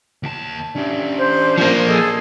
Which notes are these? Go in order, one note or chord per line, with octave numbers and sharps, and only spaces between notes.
D#2 A5
C#4 D4 G4
C5
F3 A#3
G#4 A4 D#5